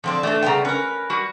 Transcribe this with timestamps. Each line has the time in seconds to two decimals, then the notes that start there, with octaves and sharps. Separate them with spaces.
0.04 D3 F3 C4 D4
0.23 E3 A3 C#4 D4
0.42 C#3 G3 B3 G5 A#5
0.65 C#4 A#4 B4
1.10 G3 F#4